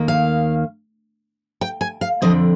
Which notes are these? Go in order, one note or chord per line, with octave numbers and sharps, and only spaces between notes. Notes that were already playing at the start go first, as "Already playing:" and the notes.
Already playing: D#2 D#3 A#3
F5
G5
G#5
F5
F2 D3 F3 C4 D#5